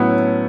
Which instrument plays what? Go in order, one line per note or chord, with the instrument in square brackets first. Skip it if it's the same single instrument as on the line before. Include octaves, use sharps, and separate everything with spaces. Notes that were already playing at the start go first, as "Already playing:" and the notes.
Already playing: [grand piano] A2 F#3 C#4 E4 C#5 [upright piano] B3